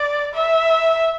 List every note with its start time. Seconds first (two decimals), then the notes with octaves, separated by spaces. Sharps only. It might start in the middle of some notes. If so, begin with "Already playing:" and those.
Already playing: D5
0.34 E5